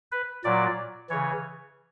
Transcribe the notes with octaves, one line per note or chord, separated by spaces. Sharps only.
B4
A#2 F#3 D5
C#3 E3 C#5